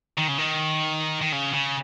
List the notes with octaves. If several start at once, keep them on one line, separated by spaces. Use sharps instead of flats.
D#3
C#3
D#3
D#3
C#3
C#3